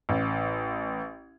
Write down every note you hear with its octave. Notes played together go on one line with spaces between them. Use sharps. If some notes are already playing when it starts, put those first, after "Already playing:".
A1